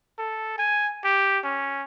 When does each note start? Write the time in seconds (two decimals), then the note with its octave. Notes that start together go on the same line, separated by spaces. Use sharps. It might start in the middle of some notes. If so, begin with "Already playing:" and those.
0.18 A4
0.58 G#5
1.04 G4
1.44 C#4